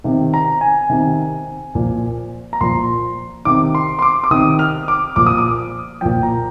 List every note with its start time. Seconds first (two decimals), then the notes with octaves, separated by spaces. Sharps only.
0.04 C3 D#3
0.34 A#5
0.61 G#5
0.90 C3 D#3
1.75 A#2 F3
2.53 A#5
2.61 A#2 F3 C6
3.45 C3 D#3 D6
3.75 C6
3.99 C6
4.02 D6
4.24 D6
4.31 C3 D#3 D#6
4.59 F6
4.88 D6
5.16 A#2 F3 D6
5.26 D#6
5.38 D6
6.01 A#2 F3 G5
6.23 A#5